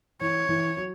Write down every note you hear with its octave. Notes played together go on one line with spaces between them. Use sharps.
E3 C#5
E3
F#3